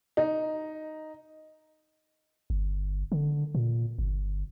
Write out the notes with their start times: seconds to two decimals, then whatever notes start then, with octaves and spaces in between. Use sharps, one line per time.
0.17 D#4
2.50 G1
3.12 D3
3.55 A#2
3.99 G1